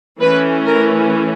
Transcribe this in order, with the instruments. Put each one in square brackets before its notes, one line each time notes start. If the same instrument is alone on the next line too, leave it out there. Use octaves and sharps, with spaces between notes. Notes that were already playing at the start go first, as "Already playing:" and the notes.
[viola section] E3 A3 C#4 B4
A#4